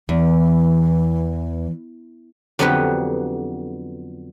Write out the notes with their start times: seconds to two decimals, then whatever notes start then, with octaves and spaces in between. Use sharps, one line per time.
0.09 E2 E3
2.59 F2 D3 F#3 B3 G4 B4